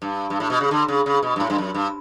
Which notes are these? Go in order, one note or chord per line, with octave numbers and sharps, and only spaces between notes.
G2
G2
A2
B2
C#3
D3
C#3
C#3
B2
G2
A2
G2
F#2
G2